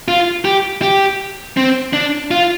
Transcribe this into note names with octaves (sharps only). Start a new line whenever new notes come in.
F4
G4
G4
C4
D4
F4